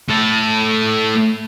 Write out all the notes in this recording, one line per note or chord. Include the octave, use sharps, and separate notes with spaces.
A2 A4